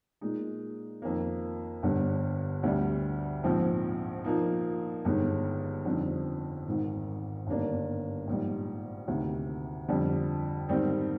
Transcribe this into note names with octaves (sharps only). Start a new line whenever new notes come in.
A#2 G#3 D#4
F2 D#3 A#3
G1 G2 D3
D2 D3 G3
A#1 G#2 F3 C4
A#2 F3 A#3 D#4
G1 G2 D#3 G#3 D#4
F2 D3 G3 C4 D#4
G#1 G#2 D#3
G1 G2 D#3 A#3 D4
A#1 G#2 G3
D2 C3 D#3
F2 D3 G3
G#2 D#3 G3 C4 D#4